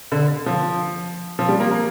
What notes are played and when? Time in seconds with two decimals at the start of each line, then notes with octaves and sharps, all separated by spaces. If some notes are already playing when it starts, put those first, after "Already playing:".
0.12 D3
0.46 F3
1.39 F3
1.49 G3
1.60 A#3
1.71 A#3